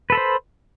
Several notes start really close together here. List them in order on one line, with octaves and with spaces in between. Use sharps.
B4 A4 B5 C5